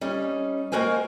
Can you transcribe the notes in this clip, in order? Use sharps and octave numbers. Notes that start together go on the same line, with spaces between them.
G3 C#4 D#4
G#3 A#3 F#4 A#4 C5 G#5